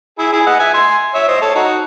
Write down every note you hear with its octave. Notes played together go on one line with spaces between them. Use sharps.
E4 G#4
E4 G#4
D#5 F#5
E5 G#5
G#5 C6
C#5 E5
C5 D#5
A4 C#5
D#4 F#4